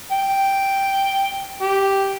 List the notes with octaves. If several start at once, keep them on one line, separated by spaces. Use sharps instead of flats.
G5
G4